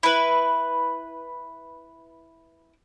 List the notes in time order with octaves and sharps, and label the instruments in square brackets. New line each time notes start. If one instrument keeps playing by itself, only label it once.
[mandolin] E4 B4